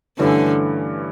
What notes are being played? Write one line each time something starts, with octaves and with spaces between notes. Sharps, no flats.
G2 D3 E3 A3 C#4 E4